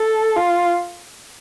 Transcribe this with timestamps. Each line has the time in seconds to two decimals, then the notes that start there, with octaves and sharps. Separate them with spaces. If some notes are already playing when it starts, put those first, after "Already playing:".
Already playing: A4
0.36 F4